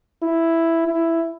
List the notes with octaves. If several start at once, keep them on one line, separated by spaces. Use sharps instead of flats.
E4
E4